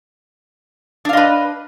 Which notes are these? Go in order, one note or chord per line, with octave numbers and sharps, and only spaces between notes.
D4 B4 D#5 F5